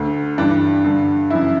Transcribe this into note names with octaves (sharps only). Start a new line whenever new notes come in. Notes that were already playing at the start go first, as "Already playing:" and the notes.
Already playing: D2 D3
G2 E3 D4
G2 D3
F#2 C#3 E3 E4